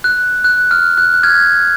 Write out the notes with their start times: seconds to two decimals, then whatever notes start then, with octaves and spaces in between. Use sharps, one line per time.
0.04 F#6
0.44 F#6
0.71 F6
0.97 F#6
1.14 F#6
1.23 F6 G#6